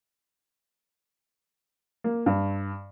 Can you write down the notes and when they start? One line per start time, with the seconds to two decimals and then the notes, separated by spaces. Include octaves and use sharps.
2.04 A#3
2.26 G2